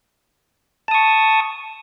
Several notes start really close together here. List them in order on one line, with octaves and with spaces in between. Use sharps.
A5 D#6 C#6